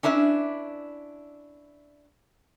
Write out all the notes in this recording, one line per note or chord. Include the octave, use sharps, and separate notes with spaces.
C#4 D4 E4 B4 E5